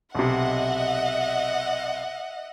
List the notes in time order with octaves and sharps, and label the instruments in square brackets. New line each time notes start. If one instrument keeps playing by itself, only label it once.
[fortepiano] B1 C3 [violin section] D#5 F#5 [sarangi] E5